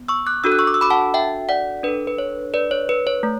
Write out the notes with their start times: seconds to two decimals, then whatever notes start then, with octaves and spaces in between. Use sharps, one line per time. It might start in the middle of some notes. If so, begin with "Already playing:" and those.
Already playing: B3
0.08 C#6 E6
0.27 D6 F#6
0.44 D4 F#4 A4 E6
0.52 F#6
0.59 C#6 E6
0.67 D6
0.74 E6
0.81 B5 D6
0.90 F#5 A5
1.14 E5 G5
1.49 D5 F#5
1.83 D4 A4 B4
2.07 B4
2.18 C#5
2.54 B4 D5
2.71 C#5
2.89 B4
3.07 C#5
3.23 A3